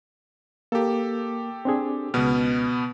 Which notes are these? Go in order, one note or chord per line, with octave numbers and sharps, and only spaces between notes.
A#3 G4 A4
C4 D4 G#4
C#2 B2 B3 F6